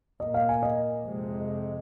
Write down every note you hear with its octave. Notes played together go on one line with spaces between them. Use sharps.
A#2 A#3 D#5
F5
G#5
D#5
F2 C3 G#3